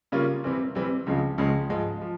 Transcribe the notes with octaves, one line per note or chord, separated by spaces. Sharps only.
C#3 G3 A#3 C#4 F4
C3 E3 G3 C4
C3 E3 G3 C4
C#2 C#3 F3 G#3
C#2 C#3 F3 G#3
G#2 F3 G#3
F3